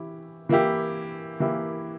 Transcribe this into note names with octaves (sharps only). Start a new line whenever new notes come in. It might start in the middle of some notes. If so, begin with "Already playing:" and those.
Already playing: E3 E4 G4
E3 A#3 E4 G4
E3 A#3 E4 G4